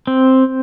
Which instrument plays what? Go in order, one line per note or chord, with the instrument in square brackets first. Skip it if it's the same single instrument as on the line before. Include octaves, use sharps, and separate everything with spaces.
[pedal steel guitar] C4